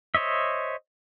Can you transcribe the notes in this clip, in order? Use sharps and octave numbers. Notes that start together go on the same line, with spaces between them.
C5 C#5 D#5 E5